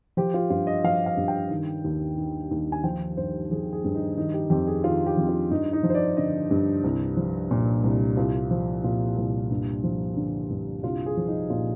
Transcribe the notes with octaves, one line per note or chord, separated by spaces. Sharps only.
F3 G4
F4
G2 F4
D#5
F3 F5
F5
G2
G5
D#3
D#2
D#3
D#2
G#5
F3 G5
G2 C5
F3 G#4
G#4
G2
D#4
D#3 D#4
G4
F2 G4
G#4
D#3 F4
G4
F2
F4
G2 D#4
D#4
F3
C5
D5
D3 D#5
G2
C2
F3
A#2
C2
C2 F4
F3
A#2 F4
C2
G2
F3
D3
G2
C2 F4
G#4
F3
D#4
A#2 F4